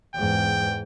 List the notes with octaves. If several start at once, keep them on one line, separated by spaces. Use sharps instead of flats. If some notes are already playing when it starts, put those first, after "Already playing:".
E2 G#2 G5